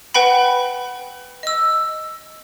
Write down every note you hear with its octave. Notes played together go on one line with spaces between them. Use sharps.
B4 F#5 G5 B5
D#5 E6